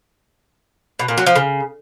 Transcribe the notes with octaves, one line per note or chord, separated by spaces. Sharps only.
B2
A#2
F#3
F3
C#3